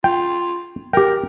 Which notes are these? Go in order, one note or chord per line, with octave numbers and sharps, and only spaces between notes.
F4 G5
G4 A#4 G5